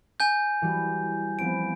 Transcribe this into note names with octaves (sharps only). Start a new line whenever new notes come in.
G#5 G6
E3 G3 F#4
F3 B3 C4 D7